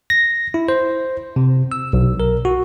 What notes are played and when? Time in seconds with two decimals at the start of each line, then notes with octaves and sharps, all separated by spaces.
0.10 A#6
0.54 E4
0.69 C5
1.36 C3
1.72 E6
1.93 B1
2.20 A#4
2.45 F#4